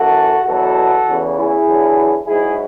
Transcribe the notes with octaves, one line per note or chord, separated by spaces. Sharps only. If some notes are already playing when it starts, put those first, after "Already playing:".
Already playing: F#2 E3 F#4 A4
E2 B2 F#3 F#4 A4
E2 C#3 E3
E4 G#4
E2 D3 F#3
G#2 F#3 E4 G#4